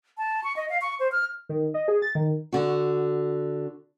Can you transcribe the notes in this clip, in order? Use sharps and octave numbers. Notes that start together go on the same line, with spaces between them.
A5
C#6
D#5
F5
C#6
C5
F6
D#3
D#5
G#4
A6
D#3
D3 F#4